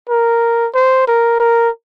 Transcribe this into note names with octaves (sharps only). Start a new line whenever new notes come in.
A#4
C5
A#4
A#4